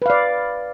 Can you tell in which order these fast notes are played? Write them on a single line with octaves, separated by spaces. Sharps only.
B4 F5 D5